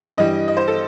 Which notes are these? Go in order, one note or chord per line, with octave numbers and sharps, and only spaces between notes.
G2 E3 G3 D#5
D#5
C5
A4